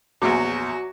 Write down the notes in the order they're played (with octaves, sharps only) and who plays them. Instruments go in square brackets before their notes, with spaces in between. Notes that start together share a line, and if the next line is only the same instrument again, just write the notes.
[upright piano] A#1 E2 [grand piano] F#3 D6 [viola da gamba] F#4